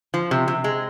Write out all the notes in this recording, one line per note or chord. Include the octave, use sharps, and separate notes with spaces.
F3
C3
C3
G#3